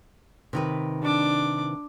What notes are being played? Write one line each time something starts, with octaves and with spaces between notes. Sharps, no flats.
C3 D#3 B4
D4 D6